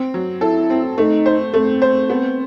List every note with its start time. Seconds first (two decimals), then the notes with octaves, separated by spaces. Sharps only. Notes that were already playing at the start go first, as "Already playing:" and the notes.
Already playing: C4
0.14 F#3
0.41 E4 A4
0.70 C4
0.98 A3 D#4
1.26 C5
1.54 A3 C4
1.82 C5
2.10 B3